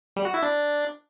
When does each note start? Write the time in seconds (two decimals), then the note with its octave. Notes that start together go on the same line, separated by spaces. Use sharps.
0.16 G3
0.25 F#4
0.34 E4
0.43 D4